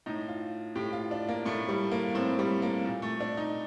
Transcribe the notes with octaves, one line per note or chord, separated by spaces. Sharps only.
A2 D#4
F4
A2 G4
F4
D4
A#3
A2 A3
G3
A#3
A2 C4
G3
A#3
A#2
A3
D4
D#4